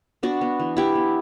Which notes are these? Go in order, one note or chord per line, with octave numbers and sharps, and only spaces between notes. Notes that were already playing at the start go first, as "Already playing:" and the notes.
B3 D4 F#4
B3
E3
E3 E4 G4
B3